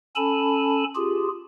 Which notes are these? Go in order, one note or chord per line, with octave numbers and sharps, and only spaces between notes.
C#4 A4 G#5 A5 B5
F4 G4 G#4